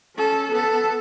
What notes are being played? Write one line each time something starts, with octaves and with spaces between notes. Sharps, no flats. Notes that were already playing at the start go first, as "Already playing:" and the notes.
C#4 A4
B3 A4